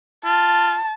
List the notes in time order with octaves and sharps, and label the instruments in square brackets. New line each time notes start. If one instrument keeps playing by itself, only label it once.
[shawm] F4 [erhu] A5